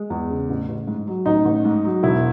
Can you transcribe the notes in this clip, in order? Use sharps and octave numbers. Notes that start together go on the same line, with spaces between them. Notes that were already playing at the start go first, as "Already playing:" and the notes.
Already playing: G#3
E2
C#3
A1
A1
G#2
F#3
A1 D#4
A1
G#2
F#3
E1 E4